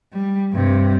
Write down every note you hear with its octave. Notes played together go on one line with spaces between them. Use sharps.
G3
G2 C3